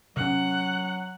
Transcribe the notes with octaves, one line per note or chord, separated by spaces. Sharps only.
C3 F#3 C#4 F#5